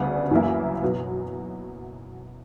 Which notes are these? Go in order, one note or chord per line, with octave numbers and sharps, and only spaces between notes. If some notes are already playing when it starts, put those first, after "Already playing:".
Already playing: D2 C#3 G3 B3
F#2 E3 A#3 E4
B2 F#3 B3